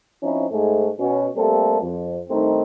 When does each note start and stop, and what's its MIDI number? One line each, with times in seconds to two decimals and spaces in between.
0.22 0.46 53
0.22 0.46 60
0.22 0.46 61
0.22 0.46 63
0.22 0.46 64
0.50 0.87 44
0.50 0.87 57
0.50 0.87 68
0.99 1.25 47
0.99 1.25 61
1.36 1.81 55
1.36 1.81 57
1.36 1.81 58
1.36 1.81 60
1.36 1.81 67
1.36 1.81 69
1.82 2.19 41
2.29 2.63 43
2.29 2.63 51
2.29 2.63 57
2.29 2.63 60
2.29 2.63 63